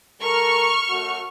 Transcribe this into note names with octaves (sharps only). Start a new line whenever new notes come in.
G3 A4 A#4 C#6 F6
F#2 A3 F#4